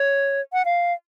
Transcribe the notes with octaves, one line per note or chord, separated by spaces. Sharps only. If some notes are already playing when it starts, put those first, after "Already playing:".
Already playing: C#5
F#5
F5